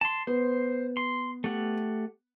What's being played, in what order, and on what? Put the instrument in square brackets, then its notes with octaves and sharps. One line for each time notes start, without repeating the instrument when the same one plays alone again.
[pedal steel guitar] A5 C6
[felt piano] B3 [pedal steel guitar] C5
[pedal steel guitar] C6
A3 G4 F#5